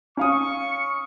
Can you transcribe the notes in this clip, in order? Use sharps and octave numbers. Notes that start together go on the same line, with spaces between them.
C#4 F5 C#6 D#6